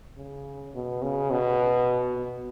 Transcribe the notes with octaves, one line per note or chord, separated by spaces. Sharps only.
C#3
B2
C#3
B2
B2